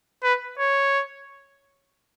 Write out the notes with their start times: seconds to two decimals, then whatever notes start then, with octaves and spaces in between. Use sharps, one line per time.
0.23 B4
0.59 C#5